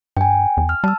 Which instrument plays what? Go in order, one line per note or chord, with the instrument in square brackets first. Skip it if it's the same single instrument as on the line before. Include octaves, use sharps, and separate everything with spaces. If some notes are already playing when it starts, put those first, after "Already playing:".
[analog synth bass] G2 [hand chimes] G5 G#5
[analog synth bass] E2
[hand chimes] F6
[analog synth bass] G3 [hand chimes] A5 E6